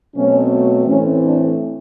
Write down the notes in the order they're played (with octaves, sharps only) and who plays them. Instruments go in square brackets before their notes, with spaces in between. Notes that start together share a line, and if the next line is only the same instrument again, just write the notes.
[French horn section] B2 F#3 A3 C4 C#4
A2 E3 A3 C4 C#4
D4